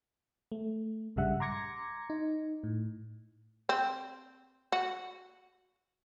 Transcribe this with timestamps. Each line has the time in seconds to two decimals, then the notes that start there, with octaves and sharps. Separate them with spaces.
0.52 A3
1.16 A#1 G2 C#3 G3 E5 F#5
1.40 A#5 C6 D6 G#6 A#6 C#7
2.10 D#4
2.64 A2
3.69 C4
4.72 F#4